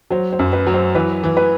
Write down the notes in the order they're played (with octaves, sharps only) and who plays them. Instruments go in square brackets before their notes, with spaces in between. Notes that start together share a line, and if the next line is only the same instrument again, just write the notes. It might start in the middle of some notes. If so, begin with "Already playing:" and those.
[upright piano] F#3 [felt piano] C5
[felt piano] C5
[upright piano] F#2
[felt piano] B4
[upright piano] F#3
[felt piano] C5
[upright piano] E3 [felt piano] B4
[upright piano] E3
[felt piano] B4